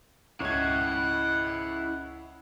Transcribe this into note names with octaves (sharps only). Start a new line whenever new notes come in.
C#2 E4 C#5 F#5 G#6